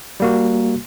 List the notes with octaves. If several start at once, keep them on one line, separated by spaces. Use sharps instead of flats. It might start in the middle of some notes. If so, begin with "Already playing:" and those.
G3 A#3 F#4